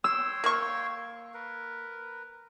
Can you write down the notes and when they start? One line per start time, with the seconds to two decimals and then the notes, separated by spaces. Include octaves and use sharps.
0.04 C#5 G5 C6 E6
0.44 A#3 C#6
1.34 A#4 B4